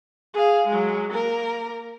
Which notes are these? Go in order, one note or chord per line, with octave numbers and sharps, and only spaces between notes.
G#4 F5
F#3 G#3
A#3 A#4